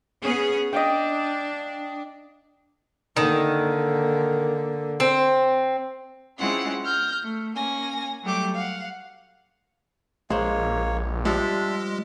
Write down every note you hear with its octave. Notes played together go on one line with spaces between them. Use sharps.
B3 C#4 G#4
D4 D#5 F5 G5
D3 D#3 A#3
C4
G#3 C4 C#4 E4 F4 F#5
F6 G6 A#6
A3
A#3 C#4 G#5 A#6
F#3 G3 A3 G4 D6
F5 F#5
A#1 G#3 A#3 C5 C#5
F3 G3 G#3 D4 E5